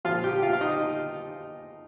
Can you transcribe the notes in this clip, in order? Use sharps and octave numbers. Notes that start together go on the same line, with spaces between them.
A#2 F3 F4 F5
G4 G5
F4 F5
F5
D#4 D#5